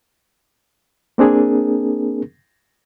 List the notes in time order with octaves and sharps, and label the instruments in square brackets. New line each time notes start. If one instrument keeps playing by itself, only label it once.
[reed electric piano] A#3 C4 D4 G#4 A#4